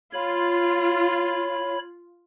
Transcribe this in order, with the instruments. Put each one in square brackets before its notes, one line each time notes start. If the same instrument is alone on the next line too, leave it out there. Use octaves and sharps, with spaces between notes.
[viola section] F4 [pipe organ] C#5 B5